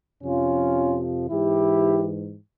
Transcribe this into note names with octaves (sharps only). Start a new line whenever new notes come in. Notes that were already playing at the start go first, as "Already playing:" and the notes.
F2 C3 F3 C#4 F4
G#2 E3 E4 G4